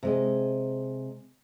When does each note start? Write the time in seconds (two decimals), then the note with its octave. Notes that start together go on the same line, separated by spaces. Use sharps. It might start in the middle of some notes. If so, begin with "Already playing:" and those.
0.03 C3 G#3 D#5